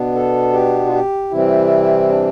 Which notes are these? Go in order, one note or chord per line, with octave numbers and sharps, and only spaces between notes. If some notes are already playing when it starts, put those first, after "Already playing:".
Already playing: B2 B3 D4
A4
G4
F4
G4
C3 E3 G3 C4 E4
D4